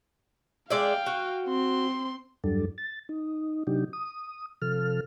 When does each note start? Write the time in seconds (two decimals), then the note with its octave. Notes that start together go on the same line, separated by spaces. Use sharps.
0.70 G#3 D5 E5 F5 G5
1.06 F#4
1.46 C4 C6
2.44 E2 G2 F#3 G3 D4 A4
2.78 A6
3.09 D#4
3.67 C3 F#3 D4 D#4 G4
3.93 D#6
4.62 C3 F3 A4 F6